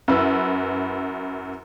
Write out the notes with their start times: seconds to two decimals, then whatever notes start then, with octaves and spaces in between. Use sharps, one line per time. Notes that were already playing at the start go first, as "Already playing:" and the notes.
0.08 F#2 E4 B4 E6